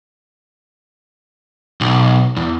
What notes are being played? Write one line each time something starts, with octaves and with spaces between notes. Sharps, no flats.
B1
E2